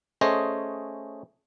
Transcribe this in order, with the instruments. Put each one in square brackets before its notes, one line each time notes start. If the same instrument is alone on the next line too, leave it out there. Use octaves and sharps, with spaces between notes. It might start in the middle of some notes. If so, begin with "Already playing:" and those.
[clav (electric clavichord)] A3 C#4 G#4 C5 D#5